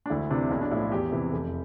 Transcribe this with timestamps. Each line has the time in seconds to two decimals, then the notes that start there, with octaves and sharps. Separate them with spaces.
0.06 D4
0.10 D2 E4
0.30 C3 E3 D4
0.51 B1 E4
0.61 D4
0.71 A2 F3 E4
0.82 F4
0.92 E2 G4
1.12 C3 E3
1.32 F1